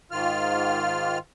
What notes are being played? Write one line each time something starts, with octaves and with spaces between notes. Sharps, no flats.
G#2 D#3 F4 F6